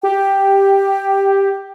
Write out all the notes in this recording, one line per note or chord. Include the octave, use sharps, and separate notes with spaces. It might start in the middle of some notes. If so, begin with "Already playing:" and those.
G4 G5